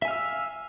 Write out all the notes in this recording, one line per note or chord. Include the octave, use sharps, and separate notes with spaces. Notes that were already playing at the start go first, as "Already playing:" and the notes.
E5 F5 G#5 E6